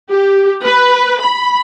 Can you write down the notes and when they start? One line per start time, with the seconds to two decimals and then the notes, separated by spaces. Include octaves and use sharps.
0.11 G4
0.64 B4
1.22 B5